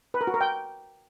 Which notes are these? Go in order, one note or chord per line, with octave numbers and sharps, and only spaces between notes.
B4
A#4
F#4
A#4
G5